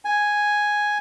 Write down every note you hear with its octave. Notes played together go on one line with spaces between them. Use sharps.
G#5